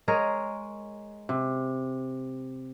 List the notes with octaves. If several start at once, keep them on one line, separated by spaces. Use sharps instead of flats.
G#3 G#4 A#4 C#5
C3